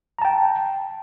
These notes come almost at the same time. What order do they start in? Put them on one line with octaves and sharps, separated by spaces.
A#5 A5 G5